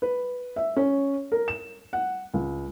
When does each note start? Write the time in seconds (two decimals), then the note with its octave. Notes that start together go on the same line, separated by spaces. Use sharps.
0.02 B4
0.56 E5
0.76 C#4
1.32 A#4
1.48 E7
1.93 F#5
2.34 C#2